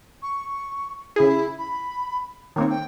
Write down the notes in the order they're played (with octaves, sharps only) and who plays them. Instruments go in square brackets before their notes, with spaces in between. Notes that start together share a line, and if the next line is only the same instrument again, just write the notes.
[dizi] C#6
[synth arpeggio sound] C#3 G#4 [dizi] E4
[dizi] B5
[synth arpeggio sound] D#3 A#3 C4 [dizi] C#5
[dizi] G5